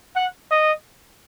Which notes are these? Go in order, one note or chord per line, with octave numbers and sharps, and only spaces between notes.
F#5
D#5